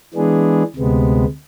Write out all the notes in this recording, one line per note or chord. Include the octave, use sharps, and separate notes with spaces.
E3 G#3 B3 D4 G#4
D2 C3 G#3 B3